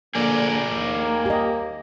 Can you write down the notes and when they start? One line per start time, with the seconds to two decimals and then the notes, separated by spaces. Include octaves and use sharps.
0.15 D3 F3 A#3 G#4 A#4 D5
0.74 D#2 A#3
1.26 G4 D#5